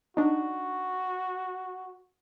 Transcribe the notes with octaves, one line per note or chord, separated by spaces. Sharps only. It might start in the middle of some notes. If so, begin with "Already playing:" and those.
D4 D#4 F#4